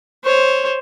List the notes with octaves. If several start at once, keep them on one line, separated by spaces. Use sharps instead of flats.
C5 C#5